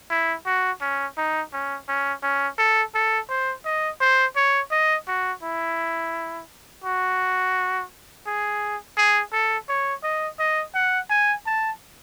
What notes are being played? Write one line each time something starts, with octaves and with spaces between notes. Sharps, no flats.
E4
F#4
C#4
D#4
C#4
C#4
C#4
A4
A4
C5
D#5
C5
C#5
D#5
F#4
E4
F#4
G#4
G#4
A4
C#5
D#5
D#5
F#5
G#5
A5